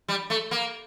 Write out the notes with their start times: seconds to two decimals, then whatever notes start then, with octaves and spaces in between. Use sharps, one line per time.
0.08 G3
0.30 A3
0.51 A#3